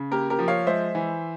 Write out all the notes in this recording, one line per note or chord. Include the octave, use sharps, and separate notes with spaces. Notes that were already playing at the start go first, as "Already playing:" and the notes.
Already playing: C#3
A#3 G4 A#4
G4 A#4
F3
C#5 F5
G#3 C5 E5
E3